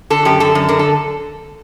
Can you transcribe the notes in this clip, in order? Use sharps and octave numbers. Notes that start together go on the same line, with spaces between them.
D3 A4
F#2 G4
D3 A4
F#2
D3 A#4
A4